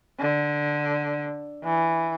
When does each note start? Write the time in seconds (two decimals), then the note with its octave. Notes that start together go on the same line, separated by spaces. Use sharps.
0.20 D3
1.64 E3